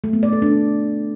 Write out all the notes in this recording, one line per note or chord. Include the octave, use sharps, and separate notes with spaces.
A3
B3
D5
A4
D4